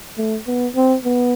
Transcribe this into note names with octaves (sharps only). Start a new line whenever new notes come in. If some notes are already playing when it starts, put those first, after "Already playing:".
A3
B3
C4
B3